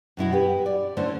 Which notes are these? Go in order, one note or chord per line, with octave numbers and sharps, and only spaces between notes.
F#2 B2 E4 F#4
G4 B4
D5
D3 A3 C#4 E4 A4 C5